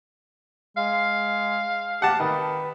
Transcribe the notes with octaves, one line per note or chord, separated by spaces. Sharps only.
G#3 F5
G4 F#5 A5
D#3 B4